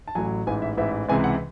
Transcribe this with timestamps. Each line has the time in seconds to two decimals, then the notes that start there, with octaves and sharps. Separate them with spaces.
0.08 A5
0.15 A1 A2 F#3 G#5
0.47 A1 G#2 E3 G#5
0.62 E5
0.77 A1 G#2 E3 E5
1.09 C#2 C3 E3 G#3 G#5
1.24 F#5